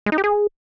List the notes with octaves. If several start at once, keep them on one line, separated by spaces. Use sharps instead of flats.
G#3
D#4
G4
G#4